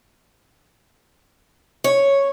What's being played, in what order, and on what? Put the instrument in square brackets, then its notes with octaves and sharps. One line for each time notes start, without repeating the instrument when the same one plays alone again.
[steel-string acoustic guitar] C#5